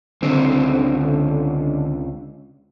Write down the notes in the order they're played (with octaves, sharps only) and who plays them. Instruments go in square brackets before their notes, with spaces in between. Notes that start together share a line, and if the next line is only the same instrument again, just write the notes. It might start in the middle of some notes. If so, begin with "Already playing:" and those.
[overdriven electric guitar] C#2 C4 [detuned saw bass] D3